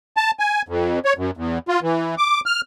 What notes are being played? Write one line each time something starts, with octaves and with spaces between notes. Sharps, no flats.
A5
G#5
F2
C#5
F#2
E2
F4
E3
D6
F6